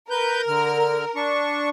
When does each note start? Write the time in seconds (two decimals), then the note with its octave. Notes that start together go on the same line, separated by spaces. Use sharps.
0.10 A#4 B4 G6
0.48 D3 F6
1.16 D4 C#6